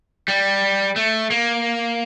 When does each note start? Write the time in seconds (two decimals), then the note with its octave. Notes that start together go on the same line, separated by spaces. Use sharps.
0.28 G3
0.96 A3
1.31 A#3